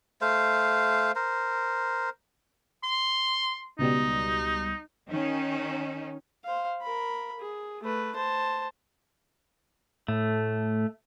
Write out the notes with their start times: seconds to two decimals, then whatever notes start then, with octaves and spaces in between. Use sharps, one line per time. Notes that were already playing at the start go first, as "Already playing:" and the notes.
0.21 A3 C5 F5
1.15 A#4 C5
2.84 C6
3.79 C#2 B2 G3 D#4
5.09 D#3 C#4 D#4
6.44 C5 F5
6.82 A#4 B5
7.39 G#4
7.83 A3 B4
8.16 C5 A5
10.08 A2 A3